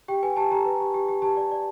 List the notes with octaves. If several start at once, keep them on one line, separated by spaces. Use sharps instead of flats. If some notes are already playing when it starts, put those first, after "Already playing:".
G4 G5
B4 G#5
G4 A5
G4 A#5
B4
G4
G4
G4
G4 A5
D5
D5